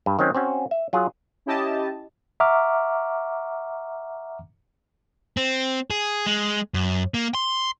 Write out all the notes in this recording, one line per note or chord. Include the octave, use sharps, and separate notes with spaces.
G2
D#3 F#3 C4 C#4
C4 C#4 F#4
E5
F#3 F4 G#4
C#4 E4 G4 D#5 A5
E5 F#5 A#5 C#6 D6 F6
C4
G#4
G#3
F#2
A#3
C6